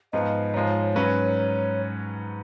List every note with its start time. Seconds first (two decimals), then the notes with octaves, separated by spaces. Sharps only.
0.13 G#2 F3 B3 F4 D#5
0.54 G#2 F3 G#3 C#5
0.95 G#2 F#3 C#4 F#4 B4